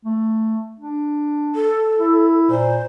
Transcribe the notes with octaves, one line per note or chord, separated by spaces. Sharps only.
A3
D4
A4
E4
A#2 C5